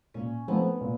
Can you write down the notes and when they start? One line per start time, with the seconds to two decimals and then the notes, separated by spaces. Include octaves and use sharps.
0.14 A#2 C#4
0.48 F3 A3 B3 C4 D#4
0.81 A#2